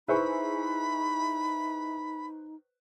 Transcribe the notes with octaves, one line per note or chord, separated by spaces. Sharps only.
D#4 E4 G#4 B4 C5 B5 C#6